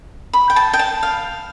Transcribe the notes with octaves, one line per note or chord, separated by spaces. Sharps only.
B5
G5
A5
G5
A5
F5